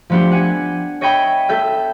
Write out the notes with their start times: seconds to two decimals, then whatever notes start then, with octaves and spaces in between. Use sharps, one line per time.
0.10 F3 A3 B3 D4 G4
0.31 F#5 G#5
1.01 C#5 D#5 E5 G5 B5
1.49 A4 E5 G6